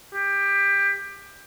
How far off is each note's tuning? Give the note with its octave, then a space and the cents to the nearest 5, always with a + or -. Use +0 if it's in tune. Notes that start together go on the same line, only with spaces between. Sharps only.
G4 +20